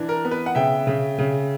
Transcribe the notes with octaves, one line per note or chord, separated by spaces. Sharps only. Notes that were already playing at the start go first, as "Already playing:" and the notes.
Already playing: E3 D4
A#4
B3
B4
F#5
C#3 E5 G5
C#3
C#3